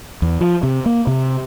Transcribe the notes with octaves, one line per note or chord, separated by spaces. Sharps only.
E2
F3
C3
A#3
C3